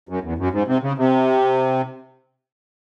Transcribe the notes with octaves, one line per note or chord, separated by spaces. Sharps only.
F#2
E2
F#2
G#2
C3
C#3
C3